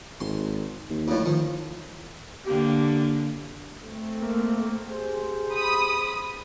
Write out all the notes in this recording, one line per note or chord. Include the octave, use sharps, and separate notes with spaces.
G#1 C6
D#2
F2 A2
D#3 F3
D3 A#3 G4
A3 C4
A#3
G4 G#4 C5
B5 D#6